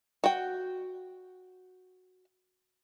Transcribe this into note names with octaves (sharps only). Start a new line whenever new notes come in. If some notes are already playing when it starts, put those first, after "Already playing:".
F#4 G5